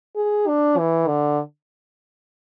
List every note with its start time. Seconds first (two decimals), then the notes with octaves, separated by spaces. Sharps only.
0.16 G#4
0.48 D4
0.78 E3
1.08 D3